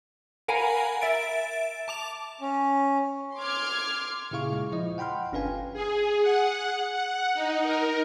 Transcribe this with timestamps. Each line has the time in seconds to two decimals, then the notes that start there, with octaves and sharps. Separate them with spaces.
0.48 A#4 F5 F#5 G#5 A#5 B5
1.02 E5 A6 D7
1.88 A5 D6 F7
2.41 C#4
3.37 C6 D6 F6 G#6
4.31 A#2 C#3 E4 G#4 F5 C#6
4.52 G#3
4.72 F3 E4 D#5
4.98 F#5 G5 B5 C6 F6
5.32 G1 C#4 D4 B4 F5 G#5
5.73 G#4
6.22 F#5
6.92 F#5
7.34 D#4
7.63 A#4